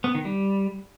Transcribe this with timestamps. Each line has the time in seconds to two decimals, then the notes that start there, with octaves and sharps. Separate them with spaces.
0.04 B3
0.15 D#3
0.25 G3